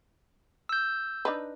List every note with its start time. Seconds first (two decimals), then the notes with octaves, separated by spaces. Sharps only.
0.69 E6 G6
1.25 D4 D#4 B4